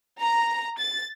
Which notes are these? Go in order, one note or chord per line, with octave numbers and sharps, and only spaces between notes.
A#5
A6